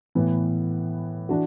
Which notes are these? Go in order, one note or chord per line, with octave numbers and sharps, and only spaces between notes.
A2 E3 B3
E3 D4 F#4